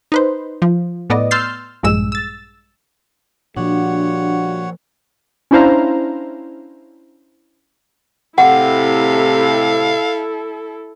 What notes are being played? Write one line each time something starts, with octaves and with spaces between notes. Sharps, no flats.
D#4 B4 C5
F3
A2 B3 D5 D#5
C6 E6 F6 G6 A6 C7
A#1 G2 G#3 E6 E7
E6 A6
A#2 F3 G3 D4 F4 F#4 C#5 F#5
C#4 D4 E4 C5 F5 A#5
A2 C3 E4 A4 F5 F#5